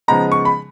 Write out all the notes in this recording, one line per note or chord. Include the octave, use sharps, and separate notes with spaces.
C#3 F3 G#3 B3 D#4 A#5
C#6
B5